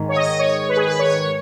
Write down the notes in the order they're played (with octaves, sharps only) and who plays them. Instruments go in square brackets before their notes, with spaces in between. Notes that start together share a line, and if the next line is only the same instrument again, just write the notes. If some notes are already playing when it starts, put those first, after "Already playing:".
Already playing: [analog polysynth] G#2 D#3
C#5
D#5
C#5
B4
G#4
B4
C#5